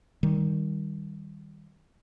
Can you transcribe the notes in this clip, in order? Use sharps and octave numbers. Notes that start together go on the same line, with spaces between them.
D#3 G3